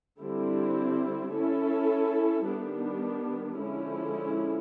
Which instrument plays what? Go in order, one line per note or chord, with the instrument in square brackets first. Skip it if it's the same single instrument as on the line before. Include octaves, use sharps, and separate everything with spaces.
[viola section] D3 G3 C4 E4
C#4 E4 A4
D#3 G3 B3 D4
D3 F3 G#3 C#4 E4